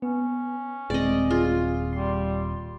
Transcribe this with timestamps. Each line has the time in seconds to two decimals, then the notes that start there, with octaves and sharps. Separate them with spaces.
0.02 B3 C#4
0.90 D#1 G#3 C4 D5 D#5
1.30 F4 G#4
1.93 G3 C6